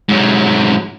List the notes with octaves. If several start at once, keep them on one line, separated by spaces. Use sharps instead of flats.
G#2 F#3